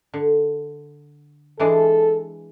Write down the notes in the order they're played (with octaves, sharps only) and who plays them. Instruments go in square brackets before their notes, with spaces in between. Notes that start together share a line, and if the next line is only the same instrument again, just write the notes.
[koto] D3
[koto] E3 G#3 D4 [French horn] A4